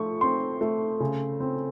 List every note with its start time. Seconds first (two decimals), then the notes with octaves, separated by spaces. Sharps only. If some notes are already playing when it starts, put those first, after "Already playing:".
Already playing: F3 A3 C#6
0.21 C4 C6
0.61 A3
1.00 C#3
1.40 C4